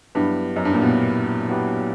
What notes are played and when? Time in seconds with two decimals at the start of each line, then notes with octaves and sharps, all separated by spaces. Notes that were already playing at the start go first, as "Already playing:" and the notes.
0.15 G2 F#3 B3 E4 G4 B4
0.56 F#2
0.65 G2
0.73 A#2
0.81 B2 F#3 B3 E4 G4 B4
1.48 F#3 B3 E4 G4 B4